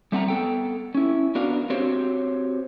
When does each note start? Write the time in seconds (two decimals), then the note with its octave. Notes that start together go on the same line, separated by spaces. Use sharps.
0.12 G3 A3 C4 F#5 G#5 A#5
0.28 B3 A4 G5
0.95 C#4 E4
1.35 B3 D4 F#4 A#4 F5
1.70 C4 F#4 G4 C5 C#5